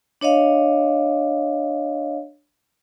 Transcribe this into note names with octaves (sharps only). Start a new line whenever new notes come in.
D4 C#5 D#5 F5